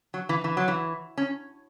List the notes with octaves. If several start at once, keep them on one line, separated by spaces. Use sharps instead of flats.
F#3
E3
E3
F#3
E3
C#4